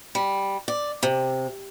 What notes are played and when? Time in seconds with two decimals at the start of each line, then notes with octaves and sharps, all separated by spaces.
0.15 G3
0.68 D5
1.03 C3